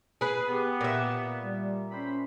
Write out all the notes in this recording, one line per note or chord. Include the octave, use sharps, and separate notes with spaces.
G#4 B4
B3 G4
A#2 E5
G3
C4 C#4 C5 B5